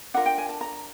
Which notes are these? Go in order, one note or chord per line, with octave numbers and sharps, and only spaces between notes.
D4 F4 A#4 F#5
G5
G#5
A5
A#5